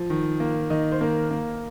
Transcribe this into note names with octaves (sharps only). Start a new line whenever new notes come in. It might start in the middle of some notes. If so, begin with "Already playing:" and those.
Already playing: F3
D#3
A#3
D#3 D#5
C5
A#3 A#4
A#3